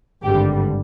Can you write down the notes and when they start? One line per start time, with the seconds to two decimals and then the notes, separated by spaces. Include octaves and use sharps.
0.23 G#1 G2 D3 G3 G4